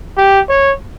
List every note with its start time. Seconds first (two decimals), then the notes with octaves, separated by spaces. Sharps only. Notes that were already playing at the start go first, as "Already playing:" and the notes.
0.17 G4
0.49 C#5